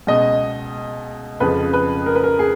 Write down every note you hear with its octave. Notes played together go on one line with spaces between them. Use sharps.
C#2 B2 D#5
F2 C#3 F3 B4
B4
A#4
B4
A#4
G#4